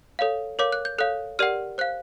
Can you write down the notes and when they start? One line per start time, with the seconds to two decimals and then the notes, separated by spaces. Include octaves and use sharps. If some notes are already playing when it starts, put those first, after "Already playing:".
0.19 A4 C#5 F5
0.59 A#4 C#5 F5 D6
0.72 F#6
0.85 G6
0.98 A4 C#5 F5 F#6
1.39 G4 A#4 D5 F#5 F6
1.78 C5 F5 F#6